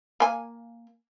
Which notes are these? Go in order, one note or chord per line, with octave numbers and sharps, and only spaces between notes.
A#3 G#5